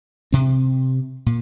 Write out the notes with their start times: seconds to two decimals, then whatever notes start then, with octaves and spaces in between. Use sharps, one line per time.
0.32 C3 C4
1.26 A#2